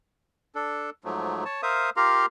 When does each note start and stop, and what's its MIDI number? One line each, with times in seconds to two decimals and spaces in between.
0.55 0.90 62
0.55 0.90 69
1.04 1.44 44
1.04 1.44 53
1.04 1.44 54
1.04 1.44 57
1.45 1.61 73
1.45 1.61 81
1.63 1.90 70
1.63 1.90 72
1.63 1.90 76
1.63 1.90 77
1.63 1.90 87
1.97 2.26 65
1.97 2.26 67
1.97 2.26 70
1.97 2.26 77
1.97 2.26 82
1.97 2.26 84